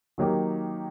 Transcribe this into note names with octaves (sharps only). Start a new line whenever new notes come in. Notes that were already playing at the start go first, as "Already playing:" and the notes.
D#3 F#3 A#3 D#4 G4